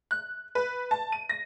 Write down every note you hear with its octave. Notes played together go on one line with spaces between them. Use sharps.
F#6
B4
A5
D#7
A#6